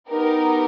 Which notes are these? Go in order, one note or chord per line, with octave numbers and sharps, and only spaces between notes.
B3 D#4 G4 A#4